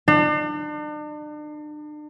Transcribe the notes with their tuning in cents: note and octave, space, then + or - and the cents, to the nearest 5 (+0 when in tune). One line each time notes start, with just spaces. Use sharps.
D4 +40